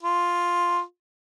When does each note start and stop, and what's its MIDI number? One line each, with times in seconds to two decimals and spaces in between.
0.03 0.82 65